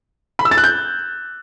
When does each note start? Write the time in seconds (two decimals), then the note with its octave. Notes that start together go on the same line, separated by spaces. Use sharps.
0.39 B5
0.45 E6
0.51 A6
0.58 F#6
0.64 G6